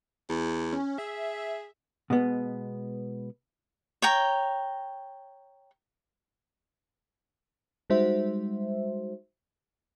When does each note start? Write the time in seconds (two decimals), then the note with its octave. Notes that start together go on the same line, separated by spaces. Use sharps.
0.29 E2
0.73 C#4
0.98 G#4 E5
2.10 B2 G#3 B3
4.02 C#5 G5 A#5
7.90 G3 G#3 D#4 F#4 C5 E5